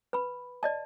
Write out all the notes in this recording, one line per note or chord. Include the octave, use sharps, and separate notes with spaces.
B4 B5
D5 D#5 A5